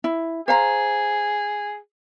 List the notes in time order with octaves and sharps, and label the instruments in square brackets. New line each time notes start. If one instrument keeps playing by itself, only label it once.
[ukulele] E4
[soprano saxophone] G#4 [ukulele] C5 F5 A#5